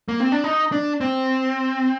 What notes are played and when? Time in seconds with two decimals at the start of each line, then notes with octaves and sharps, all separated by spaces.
0.08 A#3
0.20 C4
0.32 D4
0.44 D#4
0.72 D4
1.01 C4